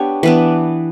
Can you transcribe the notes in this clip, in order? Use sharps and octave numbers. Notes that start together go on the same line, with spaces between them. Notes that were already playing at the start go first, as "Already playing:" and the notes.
Already playing: B3 D4 G4 C#5
E3 B3 D4 B4